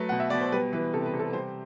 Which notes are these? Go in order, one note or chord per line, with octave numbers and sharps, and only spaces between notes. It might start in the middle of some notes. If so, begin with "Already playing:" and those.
Already playing: F#3 A3 B4
B2 F#5
E5
B2 D5
C5
G3 B4
E3 B4
C3 A4
B4
C3
A4
G3 C5